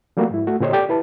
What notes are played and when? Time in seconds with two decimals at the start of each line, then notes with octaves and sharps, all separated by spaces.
0.17 F3 G3 A3 A#3 F#4
0.30 G#2 E4
0.47 A3 F#4
0.60 A#2 D3 G4 C5 C#5 D#5
0.73 G4 A4 D5 G5
0.89 E4 B4 A5